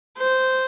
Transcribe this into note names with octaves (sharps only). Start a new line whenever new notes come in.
C5